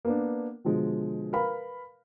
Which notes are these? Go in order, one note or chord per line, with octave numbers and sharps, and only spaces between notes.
A#3 B3 D4
B2 D3 F3 G#3
A#4 B4 F5 B5